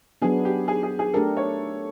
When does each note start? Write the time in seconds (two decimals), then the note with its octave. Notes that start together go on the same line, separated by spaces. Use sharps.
0.22 F#3 B3 D4 G#4
0.45 G4
0.68 G#4
0.83 G#4
0.99 G#4
1.13 A3 D4 G4 A4 A#4
1.37 C#5